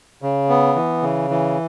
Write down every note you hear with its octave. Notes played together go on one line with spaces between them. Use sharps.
C#3
B3
E3
C#3
E3